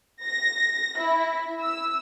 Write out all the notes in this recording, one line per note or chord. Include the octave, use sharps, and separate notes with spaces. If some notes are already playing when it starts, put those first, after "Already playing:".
A#6
E4
E6